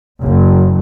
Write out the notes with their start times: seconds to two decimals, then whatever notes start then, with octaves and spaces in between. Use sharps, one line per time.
0.22 F#1